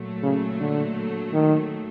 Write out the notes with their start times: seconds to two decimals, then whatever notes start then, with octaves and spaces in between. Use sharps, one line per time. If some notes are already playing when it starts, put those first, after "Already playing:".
Already playing: A#2 F#3 A3
0.23 C#3
0.60 D3
1.33 D#3